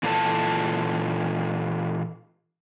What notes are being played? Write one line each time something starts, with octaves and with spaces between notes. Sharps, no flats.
A#2 E3 F4 A4 C5 A5